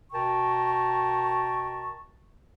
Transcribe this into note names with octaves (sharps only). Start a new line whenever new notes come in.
B2 A#4 G5 A5 A#5 C#6